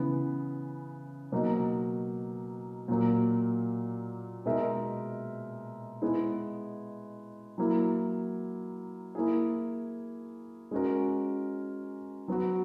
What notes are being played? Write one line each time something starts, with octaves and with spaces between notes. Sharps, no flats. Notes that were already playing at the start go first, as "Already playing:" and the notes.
Already playing: C#3 E3 B3
B2 F#3 A#3 D#4 F#4
A#2 F#3 A#3
B2 G#3 D#4 A#4 E5
G#3 B3 E4
F#3 A#3 E4
A#3 E4 G#4
G#3 C#4 F#4 A#4
F#3 B3 F#4